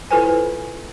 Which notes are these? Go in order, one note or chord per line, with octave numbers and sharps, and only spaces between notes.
E4 F4 A4 B4 C5 G#5